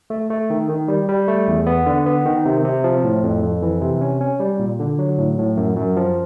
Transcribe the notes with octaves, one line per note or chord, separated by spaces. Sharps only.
A3
A3
D#3
D#3
G3
G3
A3
E2
B3
D3
B3
D#3
C3
C3
F3
A2
F2
F2
E3
C3
C#4
C#4
G3
A#2
D3
F#3
A2
A2
F#2
F#2
F3